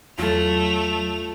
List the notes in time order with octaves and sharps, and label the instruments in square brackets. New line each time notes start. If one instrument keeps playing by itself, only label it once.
[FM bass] E2 [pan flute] F#3 [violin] A3 F7 [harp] F4 A4